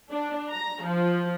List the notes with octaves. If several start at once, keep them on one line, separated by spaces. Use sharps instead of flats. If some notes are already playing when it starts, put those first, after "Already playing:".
D4
A#5
F3